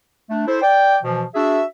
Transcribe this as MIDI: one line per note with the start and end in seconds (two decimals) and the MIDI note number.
0.30 0.43 57
0.30 0.43 62
0.47 0.62 64
0.47 0.62 69
0.47 0.62 72
0.62 0.97 74
0.62 0.97 79
1.03 1.23 47
1.03 1.23 52
1.03 1.23 53
1.35 1.62 62
1.35 1.62 66
1.35 1.62 68
1.35 1.62 76